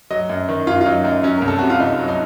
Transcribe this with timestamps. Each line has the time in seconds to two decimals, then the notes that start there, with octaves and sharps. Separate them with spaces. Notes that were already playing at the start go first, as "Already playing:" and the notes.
0.11 F#3 D#5
0.29 F#2
0.49 D#3
0.67 F#2 F4
0.81 F4
0.86 F#3 D#4
1.05 F#2 D#4
1.23 F#3 C#4
1.38 C2 A#4
1.48 A4
1.59 C3 F#4
1.70 F4
1.80 C2 D#4
1.99 F#3
2.08 D#4